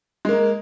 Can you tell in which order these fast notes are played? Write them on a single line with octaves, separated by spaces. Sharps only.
G#3 A#3 A#4